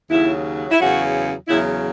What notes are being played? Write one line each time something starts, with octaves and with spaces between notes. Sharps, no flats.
D#2 C#3 F#3 E4
E4
E2 C#3 F#3 F#4
E2 C#3 F#3 E4